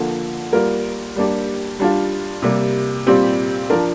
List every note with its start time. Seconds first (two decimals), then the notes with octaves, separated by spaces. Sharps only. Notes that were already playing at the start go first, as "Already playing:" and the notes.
Already playing: D3 F3 A#3
0.53 G3 A#3 F4 A#4
1.16 G3 A#3 D4 G4
1.80 G3 D4 F4
2.42 C3 G3 A#3
3.07 A#2 G3 C4 G4
3.70 F3 D4 A#4